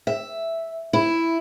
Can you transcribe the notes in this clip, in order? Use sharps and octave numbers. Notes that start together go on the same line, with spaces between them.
E5
E4